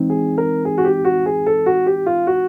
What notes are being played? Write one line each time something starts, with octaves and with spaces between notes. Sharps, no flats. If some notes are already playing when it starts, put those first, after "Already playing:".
Already playing: E3 G#3 C4 D#4
G#4
A#4
G#4
F#4
G4
F#4
G#4
A4
F#4
G4
F4
F#4